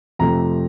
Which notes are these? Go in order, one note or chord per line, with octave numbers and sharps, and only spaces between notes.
F2 C3 F3 A3 A#5